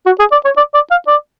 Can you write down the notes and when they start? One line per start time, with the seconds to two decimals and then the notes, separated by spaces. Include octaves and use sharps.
0.06 F#4
0.19 G#4
0.32 D5
0.45 C#5
0.57 D5
0.74 D5
0.91 F5
1.08 D5